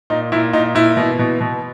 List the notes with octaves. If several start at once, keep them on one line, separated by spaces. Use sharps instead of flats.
A#2 D#4
A#2 E4
A#2 D#4
A#2 E4
B2
B2
B2